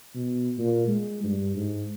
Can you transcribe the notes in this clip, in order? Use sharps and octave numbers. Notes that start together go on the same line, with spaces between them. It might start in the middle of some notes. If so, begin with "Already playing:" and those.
B2
A#2
G#3
G2
G#2